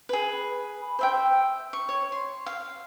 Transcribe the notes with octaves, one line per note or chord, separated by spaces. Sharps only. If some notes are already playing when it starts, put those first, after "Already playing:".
G#4 B4
C5 E5 G5
C#6
C#5
C6
F5